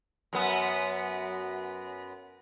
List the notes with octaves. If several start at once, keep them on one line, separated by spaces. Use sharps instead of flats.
F#2 B3